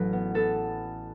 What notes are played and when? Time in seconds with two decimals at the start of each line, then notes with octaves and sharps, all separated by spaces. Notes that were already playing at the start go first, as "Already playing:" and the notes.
Already playing: A1 F#3 B4
0.13 B3
0.35 B3 A4